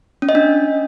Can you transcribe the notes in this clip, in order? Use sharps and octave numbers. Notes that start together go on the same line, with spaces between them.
C#4
D#5
D4